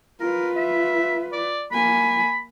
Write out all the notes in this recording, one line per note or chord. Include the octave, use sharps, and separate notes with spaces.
F4 A#4 B4
E5
D5
A#3 G#5 B5